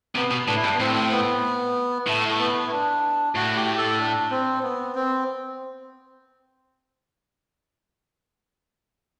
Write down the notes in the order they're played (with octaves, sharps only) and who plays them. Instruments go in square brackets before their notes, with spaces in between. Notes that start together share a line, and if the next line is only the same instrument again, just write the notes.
[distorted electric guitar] C3 [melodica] B3
[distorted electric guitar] B2
[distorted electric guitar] A2 [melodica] D4
[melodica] E4
[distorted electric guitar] G2 [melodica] D4
[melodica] B3
[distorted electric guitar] A2 [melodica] C4
[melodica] B3
[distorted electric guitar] A2 [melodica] A3
[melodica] A3
B3
E4
D4
[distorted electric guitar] A2 [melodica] F#4
[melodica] G4
A4
D4
C4
B3
C4